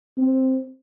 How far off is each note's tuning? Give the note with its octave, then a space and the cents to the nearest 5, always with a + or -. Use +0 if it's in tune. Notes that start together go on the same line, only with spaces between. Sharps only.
C4 +5